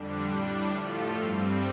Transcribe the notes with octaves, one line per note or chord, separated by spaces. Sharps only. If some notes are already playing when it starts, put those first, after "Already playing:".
Already playing: F2 D3 G3 D4
A2 G3 D4
A2 F3 A3 F4 A4
G2 G3 C4